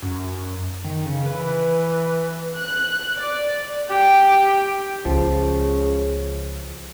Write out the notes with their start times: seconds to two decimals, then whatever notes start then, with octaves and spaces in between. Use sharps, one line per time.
0.02 F#2
0.84 D#3
1.06 C#3
1.26 E3 B4
2.56 F#6
3.16 D5
3.90 G4 G5
5.05 C#2 C#3 F3